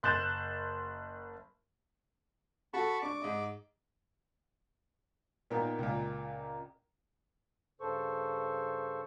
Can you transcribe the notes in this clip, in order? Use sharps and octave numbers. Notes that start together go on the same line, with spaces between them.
F#1 C6 F#6 G6 A6 E7
F#4 A4 A5 B5 C#6
D4 C#6 D6
G#2 D#5
A#2 D#3 B3 A#4 G5
C#2 A#2
G2 C#3 A4 C5 C#6